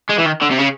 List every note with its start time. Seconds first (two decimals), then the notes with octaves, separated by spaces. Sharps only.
0.10 G#3
0.19 E3
0.26 D#3
0.42 D3
0.51 C3
0.59 C#3